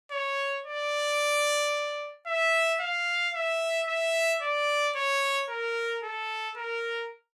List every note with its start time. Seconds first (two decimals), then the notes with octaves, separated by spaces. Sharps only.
0.11 C#5
0.65 D5
2.27 E5
2.80 F5
3.34 E5
3.88 E5
4.42 D5
4.96 C#5
5.49 A#4
6.03 A4
6.57 A#4